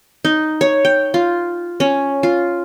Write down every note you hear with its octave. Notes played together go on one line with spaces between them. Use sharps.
D#4
C#5
G5
F4
C#4
F4